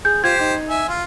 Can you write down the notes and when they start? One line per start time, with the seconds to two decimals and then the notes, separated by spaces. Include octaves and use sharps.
0.05 G#4 G6
0.24 F4 G4 C5 G#6
0.40 D#4
0.69 E5 G#5
0.89 F4